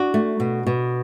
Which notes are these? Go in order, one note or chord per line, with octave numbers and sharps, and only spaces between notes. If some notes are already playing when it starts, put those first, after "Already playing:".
Already playing: D4 F#4
A3
B2
B2